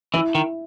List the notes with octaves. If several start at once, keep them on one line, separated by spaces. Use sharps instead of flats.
E3 E4
D#3